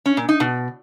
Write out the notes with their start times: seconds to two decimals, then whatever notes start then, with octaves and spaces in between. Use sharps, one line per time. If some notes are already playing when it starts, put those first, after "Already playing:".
0.06 C#4
0.17 A#2
0.29 D#4
0.40 B2